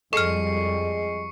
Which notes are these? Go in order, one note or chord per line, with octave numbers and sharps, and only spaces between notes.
F2 G3 G#3 A4 C#6 F6 C7 C#7